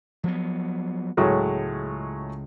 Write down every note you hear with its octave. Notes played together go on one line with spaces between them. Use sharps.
F3 F#3 B3
C#2 A2 F#3 G#3